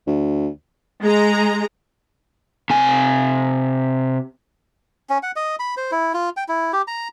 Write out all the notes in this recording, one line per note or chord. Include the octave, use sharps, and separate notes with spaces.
D2
G#3 A#5
C3 G#5
C#4
F#5
D#5
B5
C5
E4
F4
G5
E4
G4
A#5